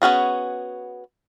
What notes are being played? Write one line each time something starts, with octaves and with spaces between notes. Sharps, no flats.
B3 C#4 F#4 G#4